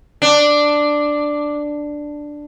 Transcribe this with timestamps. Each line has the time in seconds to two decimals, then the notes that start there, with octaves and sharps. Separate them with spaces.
0.22 D4